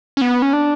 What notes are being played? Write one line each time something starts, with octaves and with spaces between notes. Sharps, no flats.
C#4
B3
C#4
D4